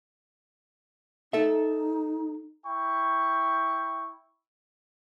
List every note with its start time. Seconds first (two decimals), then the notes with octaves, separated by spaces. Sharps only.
1.33 D#4 A4 E5
2.65 E4 G5 C#6